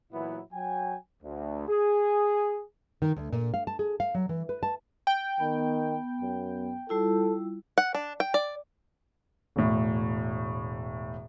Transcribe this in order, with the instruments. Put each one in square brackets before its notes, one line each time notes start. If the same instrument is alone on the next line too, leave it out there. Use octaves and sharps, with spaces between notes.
[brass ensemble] A#2 E3 F#3 B3 E4
F#3 G5 G#5
D2
G#4
[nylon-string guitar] D#3
D2
A#2
F5
A5
G#4
F5
F#3
E3
B4
A5
[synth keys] G5
[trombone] D#3 [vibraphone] B3
[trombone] F#2
[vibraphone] G3 E4 F4 [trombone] A4
[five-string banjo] F#5
D4
G5
D5
[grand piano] E1 A2